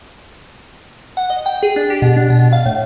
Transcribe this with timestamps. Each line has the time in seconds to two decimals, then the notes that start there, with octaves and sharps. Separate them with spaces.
1.17 F#5
1.30 D#5
1.46 G5
1.63 G#4
1.76 D4
1.90 G4
2.02 B2
2.16 D4
2.30 B2
2.53 F5
2.66 A2